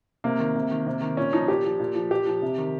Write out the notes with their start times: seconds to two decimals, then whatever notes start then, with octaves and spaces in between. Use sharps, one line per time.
0.24 C3 A#3
0.39 D#3
0.56 C3
0.71 D#3
0.86 C3
1.01 D#3
1.17 A#2 C#4
1.33 F3 D#4
1.48 A#2 G4
1.65 F3
1.80 A#2
1.95 F3
2.11 A#2 G4
2.27 F3
2.42 C3
2.58 D#3